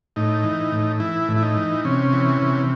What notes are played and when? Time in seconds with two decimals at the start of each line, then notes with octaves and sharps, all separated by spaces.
0.16 A2 D#4
0.44 E3
0.72 A2
1.00 E3 E4
1.28 A2
1.36 E4
1.43 D#4
1.57 E3
1.85 C3 C#4
2.13 E3
2.42 C3